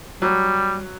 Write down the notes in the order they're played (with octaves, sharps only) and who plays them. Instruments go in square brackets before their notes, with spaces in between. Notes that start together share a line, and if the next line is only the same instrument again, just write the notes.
[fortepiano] F#3 [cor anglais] G3